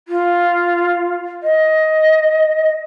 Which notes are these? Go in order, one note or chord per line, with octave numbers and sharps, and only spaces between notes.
F4
D#5